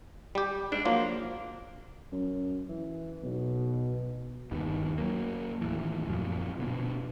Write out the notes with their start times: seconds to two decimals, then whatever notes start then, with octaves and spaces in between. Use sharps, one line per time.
0.35 G3 G4
0.72 G#2 D4
0.85 F3 F#3 A#3 F4
2.12 F#2
2.69 E3
3.23 B1 B2
4.51 G1 D#2 D#3 B3
4.98 F#3 A#3
5.61 D#2 A2 E3
6.10 F#2 A#2 F3
6.59 B2 D3 B3